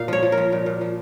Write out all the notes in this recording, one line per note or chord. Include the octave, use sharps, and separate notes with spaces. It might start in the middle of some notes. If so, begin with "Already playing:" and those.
Already playing: A#2 F5
F3 C#5
F3
A#4
F3
A#2
A#2
F3